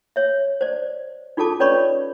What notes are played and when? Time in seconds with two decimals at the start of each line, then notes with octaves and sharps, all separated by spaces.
0.16 C#5 E5
0.61 C5 D5
1.37 D#4 F4 G#4 A4 A5 D6
1.60 C#4 B4 C#5 D5 B5 C#6